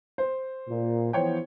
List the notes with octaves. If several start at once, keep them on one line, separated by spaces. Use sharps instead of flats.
C5
A#2
E3 F3 B3 C5 C#5 G5